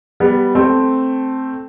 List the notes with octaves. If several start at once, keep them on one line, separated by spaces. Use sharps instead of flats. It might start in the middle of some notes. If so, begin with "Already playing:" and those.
G3 B3
A3 C4